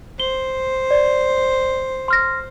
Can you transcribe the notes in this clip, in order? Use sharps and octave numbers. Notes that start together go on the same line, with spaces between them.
C5 G7
D5
C6 F6 A#6